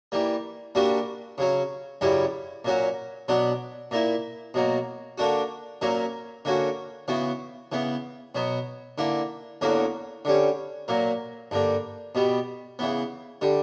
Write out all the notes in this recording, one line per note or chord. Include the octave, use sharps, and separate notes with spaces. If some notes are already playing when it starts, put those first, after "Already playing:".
E3 G3 A#3
A#2 G3 A#3 D4 F#4
C#3 F#3 C#4
F#2 C#3 G3 C#4 E4
A#2 F#3 C#4 F#4
B2 F#3 B3 D4
A#2 A#3 E4
B2 F#3 A#3
D3 A#3 D4 F#4
A#2 F#3 A#3 C#4
D3 A#3 C#4 F#4
C#3 E3 B3 F#4
C#3 E3 B3
B2 F#3 B3
D3 A#3 E4
E2 D3 A#3 C#4 F#4
D3 G3 C#4
A#2 F#3 A#3
G2 D3 A#3
B2 G3 B3
C#3 E3 B3
D3 G3